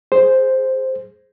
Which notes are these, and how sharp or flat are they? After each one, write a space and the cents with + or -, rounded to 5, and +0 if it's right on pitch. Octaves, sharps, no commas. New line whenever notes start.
G#4 +0 C5 +0